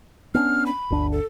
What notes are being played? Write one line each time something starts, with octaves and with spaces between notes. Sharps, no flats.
B3 C#4 D4 F6
B5
G1 D2 D4
A4